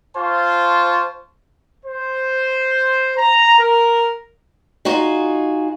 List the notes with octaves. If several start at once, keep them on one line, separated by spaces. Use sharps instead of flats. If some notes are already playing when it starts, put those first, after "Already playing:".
F4 C5 A5 C#6
C5
A#5
A#4
D#4 F4 F#4 G#4